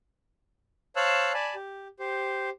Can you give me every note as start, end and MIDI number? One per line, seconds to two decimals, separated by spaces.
0.96 1.33 72
0.96 1.33 73
0.96 1.33 77
0.96 1.33 81
0.96 1.33 88
0.96 1.33 90
1.34 1.55 74
1.34 1.55 80
1.34 1.55 81
1.34 1.55 83
1.55 1.88 67
2.00 2.50 67
2.00 2.50 72